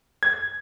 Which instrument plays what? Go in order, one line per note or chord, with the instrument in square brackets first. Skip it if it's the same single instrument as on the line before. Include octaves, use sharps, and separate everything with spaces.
[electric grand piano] G#6